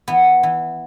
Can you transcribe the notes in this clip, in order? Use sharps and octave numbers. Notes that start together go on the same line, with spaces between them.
E3 B3
E3